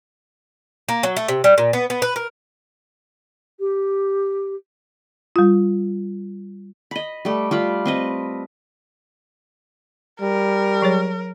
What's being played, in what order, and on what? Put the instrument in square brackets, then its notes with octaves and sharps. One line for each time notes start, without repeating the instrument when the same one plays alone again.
[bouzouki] A#3
F#3
A3
C3
G3
A#2
B3
B3
B4
A#4
[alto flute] G4
[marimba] G3 F4
[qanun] D#5 B5
G3 A3
G3 F4 B5
C4 B4 D#5
[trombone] G3 [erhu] A#4
[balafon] F#3 G#4 C#5